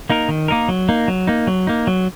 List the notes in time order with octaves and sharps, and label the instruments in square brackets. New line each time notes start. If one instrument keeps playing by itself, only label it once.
[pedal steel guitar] A#3 D#4 A#4
D#3
A#3 D#4 A#4
F#3
A#3 D#4
F#3
A#3 D#4
F#3
A#3 D#4
F#3